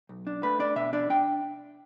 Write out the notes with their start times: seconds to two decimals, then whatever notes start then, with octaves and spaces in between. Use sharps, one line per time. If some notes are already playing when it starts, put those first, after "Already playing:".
0.09 B1
0.27 D4
0.43 A3 B4
0.59 D4 D5
0.76 B2 E5
0.93 D4 D5
1.10 D4 G5